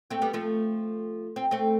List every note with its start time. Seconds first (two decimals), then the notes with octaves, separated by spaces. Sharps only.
0.10 A3 C4
0.22 G3 B3
0.33 F3 A3
1.36 C4
1.51 A3 C4